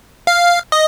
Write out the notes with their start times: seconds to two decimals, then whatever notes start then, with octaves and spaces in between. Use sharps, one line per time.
0.27 F5
0.72 D#5